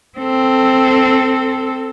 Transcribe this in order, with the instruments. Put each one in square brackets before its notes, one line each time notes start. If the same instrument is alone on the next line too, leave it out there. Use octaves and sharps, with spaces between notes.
[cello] C4 A4